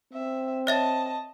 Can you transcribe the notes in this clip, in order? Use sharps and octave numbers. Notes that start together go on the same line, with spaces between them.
C4 E5
C#5 D#5 E5 A5 A6